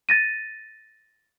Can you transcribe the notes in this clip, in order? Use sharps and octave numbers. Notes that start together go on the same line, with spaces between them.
A6 A#6 D#7